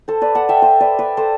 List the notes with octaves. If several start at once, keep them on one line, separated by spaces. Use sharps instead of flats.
A4 C5
B4 D5
F#5 A5
E5 G5
C5 E5
B4 D5
B4 D5
A4 C5